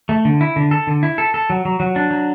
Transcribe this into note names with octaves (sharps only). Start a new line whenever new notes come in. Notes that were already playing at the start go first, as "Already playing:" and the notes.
A3
D3
E4
D3
A4
D3
E4
A4
A4
F#3
F#3
F#3
D4
F#3